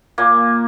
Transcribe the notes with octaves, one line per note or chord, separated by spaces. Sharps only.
A#2 A#3